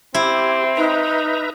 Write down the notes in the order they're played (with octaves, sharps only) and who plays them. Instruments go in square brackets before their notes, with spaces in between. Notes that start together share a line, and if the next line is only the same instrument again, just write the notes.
[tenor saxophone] C4 [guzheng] E4 [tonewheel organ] G4
[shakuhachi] D#4 [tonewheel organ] B4 E5 A#5